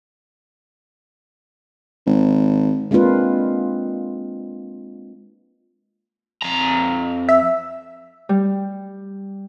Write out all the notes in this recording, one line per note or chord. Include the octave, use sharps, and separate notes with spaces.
G#1
G#3 A#3 C4 D4 F4 B4
F2 A#5
E5
G3